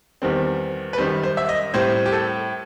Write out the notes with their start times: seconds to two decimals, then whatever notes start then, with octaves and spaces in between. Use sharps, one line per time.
0.22 E2 D#3 G3 C4
0.93 B4
0.98 F#2 D#3 G3 C5
1.23 C5
1.37 E5
1.49 D#5
1.74 A2 G3 C4 C5
2.06 G4
2.12 A4